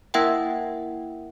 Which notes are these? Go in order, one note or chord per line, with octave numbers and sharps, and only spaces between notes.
A#3 E4 A#4 E5 F#5 G5